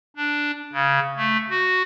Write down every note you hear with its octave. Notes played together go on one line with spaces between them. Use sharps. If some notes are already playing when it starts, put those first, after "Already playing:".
D4
C#3
A3
F#4